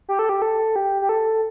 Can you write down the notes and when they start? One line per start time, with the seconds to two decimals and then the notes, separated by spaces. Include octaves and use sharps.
0.09 G4
0.19 A4
0.29 G4
0.42 A4
0.76 G4
1.02 G4
1.09 A4